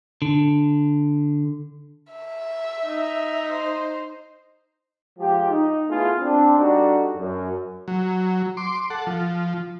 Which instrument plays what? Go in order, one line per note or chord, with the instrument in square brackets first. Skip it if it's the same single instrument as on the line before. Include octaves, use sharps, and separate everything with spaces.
[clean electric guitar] D3
[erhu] E5
[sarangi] D#4
[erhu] C5
[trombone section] F3 G#3 G4
D#4
A3 B3 E4 F4 G#4
C4 D4
G3 D4 D#4 F#4 A4
F#2
[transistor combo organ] F#3
C6 D6
A4 F#5
F3